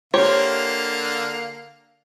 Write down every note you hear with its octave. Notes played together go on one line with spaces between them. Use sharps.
D3 A#3 G4 C5 C#5 F5